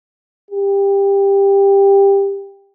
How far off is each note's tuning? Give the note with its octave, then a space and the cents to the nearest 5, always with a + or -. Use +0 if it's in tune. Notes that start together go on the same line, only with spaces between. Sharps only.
G4 +15